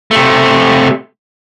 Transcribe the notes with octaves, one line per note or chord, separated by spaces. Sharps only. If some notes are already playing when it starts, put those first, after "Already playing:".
C3 A3